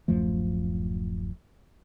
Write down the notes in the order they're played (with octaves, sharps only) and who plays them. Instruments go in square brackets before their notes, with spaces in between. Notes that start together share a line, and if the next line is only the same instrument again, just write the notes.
[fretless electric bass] D1 F#2 F3 A3